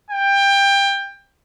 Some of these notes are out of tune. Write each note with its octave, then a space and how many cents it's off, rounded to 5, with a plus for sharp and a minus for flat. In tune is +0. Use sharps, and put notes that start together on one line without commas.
G5 +20